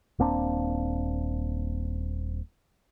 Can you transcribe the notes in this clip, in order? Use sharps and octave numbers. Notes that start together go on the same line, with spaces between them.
D#1 A#3 C4 D4